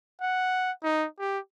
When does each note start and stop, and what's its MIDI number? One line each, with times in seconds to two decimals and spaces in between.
0.21 0.72 78
0.83 1.06 63
1.19 1.39 67